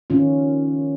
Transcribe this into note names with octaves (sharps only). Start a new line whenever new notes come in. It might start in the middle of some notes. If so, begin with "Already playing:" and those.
D#3 C#4 F4